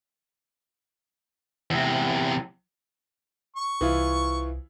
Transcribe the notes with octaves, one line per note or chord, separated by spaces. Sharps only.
E2 C3
C#6
C2 E3 E4 F4